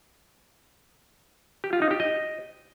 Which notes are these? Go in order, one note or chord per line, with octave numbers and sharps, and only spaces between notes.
G4
F4
D#4
G4
D#5